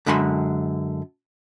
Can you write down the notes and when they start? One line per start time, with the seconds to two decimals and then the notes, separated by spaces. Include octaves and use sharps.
0.06 F#2 D3 G#3 B5 C6